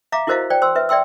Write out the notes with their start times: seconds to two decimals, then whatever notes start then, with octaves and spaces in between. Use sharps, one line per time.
0.12 E5 F5 A#5 D6
0.27 E4 F#4 A#4 C5 D#5 F5
0.50 C5 D5 G5
0.62 C5 C6 E6
0.75 B4 E5
0.89 D5 E5 G5 C6 E6